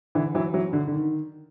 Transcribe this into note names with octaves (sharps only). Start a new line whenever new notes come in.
D3 E3
E3 F#3
E3 F#3
D3
D3
D#3